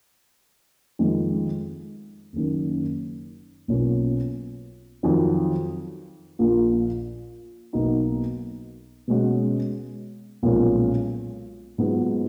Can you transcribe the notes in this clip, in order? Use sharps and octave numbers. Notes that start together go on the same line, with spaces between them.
F2 D#3 G#3
F#1 F#2 D#3
B1 B2 A#3 C#4 F4
F2 D#3 F#3
A#1 A#2 F3
B1 B2 A#3 D#4 F#4
B2 G#3 C#4 F#4
B1 A#2 F3 G#3 C#4
G#2 F#3 B3 F4 G#4